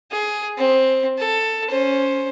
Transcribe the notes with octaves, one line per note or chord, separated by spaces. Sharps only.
G#4
C4
A4
C#4 C5